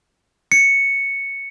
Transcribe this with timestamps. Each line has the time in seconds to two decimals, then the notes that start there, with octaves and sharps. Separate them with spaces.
0.52 C#7